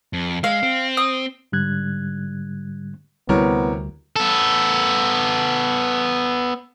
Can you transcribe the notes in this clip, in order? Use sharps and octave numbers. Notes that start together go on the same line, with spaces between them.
F2
G#3 F5
C4
D#6
G#2 D3 G3 F#6 G#6
D2 C3 G3 B3 E4 A#4 C#5
B3 A4